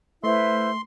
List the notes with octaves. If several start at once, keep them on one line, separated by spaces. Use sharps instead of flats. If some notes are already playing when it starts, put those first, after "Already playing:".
A3 E4 B4 C5 E5 C6